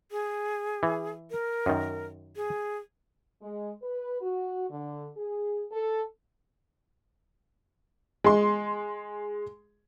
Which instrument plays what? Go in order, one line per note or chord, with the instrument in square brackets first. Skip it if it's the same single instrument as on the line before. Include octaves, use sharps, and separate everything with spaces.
[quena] G#4
[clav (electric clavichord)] E3
[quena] A#4
[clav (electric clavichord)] F#2 D#3
[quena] G#4
[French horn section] G#3
B4
F#4
D3
G#4
A4
[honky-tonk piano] G#3 C6